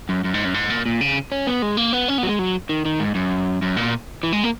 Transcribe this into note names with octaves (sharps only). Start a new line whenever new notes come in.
F#2
F#2
G#2
F#2
G#2
A#2
A#2
C#3
C#4
B3
G#3
A#3
B3
C#4
B3
F#3
G#3
F#3
D#3
D#3
G#2
F#2
F#2
A#2
E3
G#3
A#3